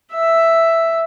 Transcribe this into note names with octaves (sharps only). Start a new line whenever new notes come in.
E5